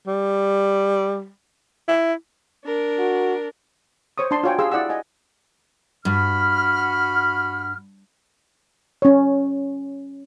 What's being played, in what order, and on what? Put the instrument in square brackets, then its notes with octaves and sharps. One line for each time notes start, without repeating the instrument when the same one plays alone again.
[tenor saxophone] G3
E4
[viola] D4 A#4
[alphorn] F#4
[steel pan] C5 C#5 C#6 D#6
D4 A5 C6
F4 F#4 C#5 G5 G#5
G4 G#4 F5 C6 E6
E4 D5 F#5 E6
D#5 F#5 G#5
[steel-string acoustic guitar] G2 [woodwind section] F#4 B5 F6
[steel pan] C#4 C#5